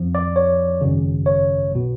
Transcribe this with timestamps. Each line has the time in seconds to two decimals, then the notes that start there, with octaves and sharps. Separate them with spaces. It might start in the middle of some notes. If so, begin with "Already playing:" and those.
Already playing: F2 F3
0.15 D5
0.36 C#5
0.81 G#1 F#2 C#3
1.26 C#5
1.71 B1 B2